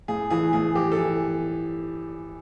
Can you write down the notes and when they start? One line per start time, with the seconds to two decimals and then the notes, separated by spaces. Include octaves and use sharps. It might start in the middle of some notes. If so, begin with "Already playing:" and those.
0.08 A2 G#4
0.30 E3 G#4
0.53 A2 G#4
0.75 E3 G4
0.92 A4
0.98 E3